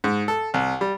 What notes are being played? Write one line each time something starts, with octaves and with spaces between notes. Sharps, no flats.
G#2
A4
C2
G3